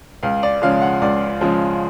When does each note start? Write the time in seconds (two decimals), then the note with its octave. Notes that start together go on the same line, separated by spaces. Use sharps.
0.23 C#2 F5
0.43 D5
0.62 C#3 F3 G#3 F5
0.82 F#5
1.01 C#2 D5
1.41 C#3 F3 G#3